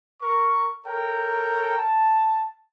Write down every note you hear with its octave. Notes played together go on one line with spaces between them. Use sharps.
A#4 C#6
A4 A#4 C#5 G5 A#5
A5